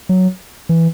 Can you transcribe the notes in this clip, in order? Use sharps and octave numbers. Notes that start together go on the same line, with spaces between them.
F#3
E3